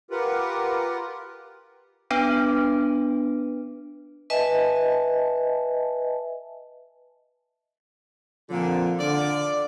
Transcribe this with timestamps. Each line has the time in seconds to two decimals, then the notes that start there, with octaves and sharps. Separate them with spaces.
0.11 F4 G4 A#4 B4 F#5
2.11 B3 D4 B4
4.30 B4 D#5 E5 G#5 A5
8.50 A#2 D3 F3 C4 F4
8.99 D3 F4 D5